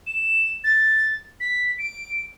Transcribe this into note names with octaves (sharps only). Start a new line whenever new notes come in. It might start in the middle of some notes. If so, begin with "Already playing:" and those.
E7
A6
B6
D7